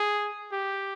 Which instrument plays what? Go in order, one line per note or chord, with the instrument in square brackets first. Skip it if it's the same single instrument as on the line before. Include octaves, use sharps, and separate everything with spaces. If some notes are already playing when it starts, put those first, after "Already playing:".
Already playing: [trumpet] G#4
G4